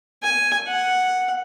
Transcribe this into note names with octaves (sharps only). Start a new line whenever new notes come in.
G#5
F#5